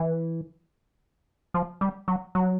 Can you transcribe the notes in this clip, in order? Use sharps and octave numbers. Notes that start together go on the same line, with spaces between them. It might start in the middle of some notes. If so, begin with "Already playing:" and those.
Already playing: E3
F3
G3
F#3
F#3